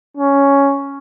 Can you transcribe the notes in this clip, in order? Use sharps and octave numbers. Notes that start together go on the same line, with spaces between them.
C#4